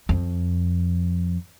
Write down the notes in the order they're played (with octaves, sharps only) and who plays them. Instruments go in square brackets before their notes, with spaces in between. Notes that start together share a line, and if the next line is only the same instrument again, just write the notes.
[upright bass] F2